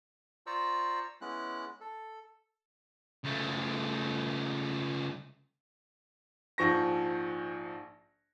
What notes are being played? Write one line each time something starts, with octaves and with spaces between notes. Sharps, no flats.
F4 C5 D5 A#5 C#6 E6
G#3 B3 C#4 E4 F#6
A4
C#2 A3
A#1 G#2 F3 C#6 A#6